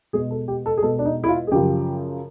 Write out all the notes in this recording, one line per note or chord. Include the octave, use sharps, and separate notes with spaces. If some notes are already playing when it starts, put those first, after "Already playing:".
B2 G#3 G#4
A4
G4
A4
G#4
B2 G#3 A4
D4
D#4
E4
F4
G#4
F#2 C#3 F3 G4